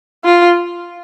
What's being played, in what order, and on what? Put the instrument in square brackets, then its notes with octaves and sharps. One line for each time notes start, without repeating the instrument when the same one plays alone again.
[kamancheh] F4